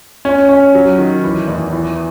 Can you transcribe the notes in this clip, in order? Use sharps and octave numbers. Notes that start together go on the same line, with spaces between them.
C#4
C#4
F#3
D#3
E3
E2
E3